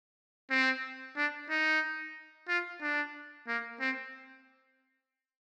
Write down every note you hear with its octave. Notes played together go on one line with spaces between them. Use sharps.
C4
D4
D#4
F4
D4
A#3
C4